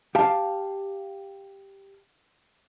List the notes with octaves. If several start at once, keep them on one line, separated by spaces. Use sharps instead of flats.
G4 F5 A5